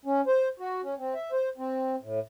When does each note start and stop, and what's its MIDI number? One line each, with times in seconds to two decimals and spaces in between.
0.05 0.21 61
0.27 0.48 72
0.60 0.81 66
0.83 0.94 61
0.98 1.14 60
1.15 1.31 76
1.32 1.49 72
1.58 1.96 60
2.02 2.20 45